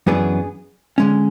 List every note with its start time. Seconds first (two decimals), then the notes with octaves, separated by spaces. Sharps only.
0.07 F#2 E3 B3 D4 G#4
0.98 D3 G#3 C#4